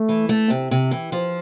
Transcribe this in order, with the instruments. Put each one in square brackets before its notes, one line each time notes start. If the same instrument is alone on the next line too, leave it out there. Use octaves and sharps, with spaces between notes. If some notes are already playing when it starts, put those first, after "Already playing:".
Already playing: [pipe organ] A3
[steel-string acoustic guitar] E3
A3
C3
C3
E3
F3